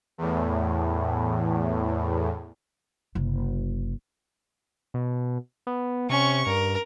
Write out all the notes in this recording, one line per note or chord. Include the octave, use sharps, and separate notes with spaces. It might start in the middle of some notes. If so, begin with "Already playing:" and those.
E2 A2
F#1 C3
B2
B3
C3 C#4 C#6
G2 A#4